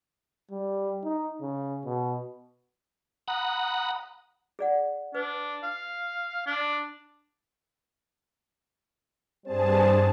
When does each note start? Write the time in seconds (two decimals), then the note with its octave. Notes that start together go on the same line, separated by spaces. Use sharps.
0.52 G3
1.03 D#4
1.42 C#3
1.85 B2
3.28 F#5 A#5 B5 D#6 F#6
4.59 G#4 D5 F#5
5.15 D4 B4
5.64 F5
6.47 D4
9.46 G2 G3 C4 G#4 C5 A5